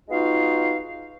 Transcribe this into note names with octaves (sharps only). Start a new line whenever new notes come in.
G#3 B3 D#4 F4 F#4 F5